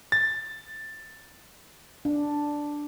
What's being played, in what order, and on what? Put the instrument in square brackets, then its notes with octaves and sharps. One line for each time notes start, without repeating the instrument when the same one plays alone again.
[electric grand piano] A6
[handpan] D4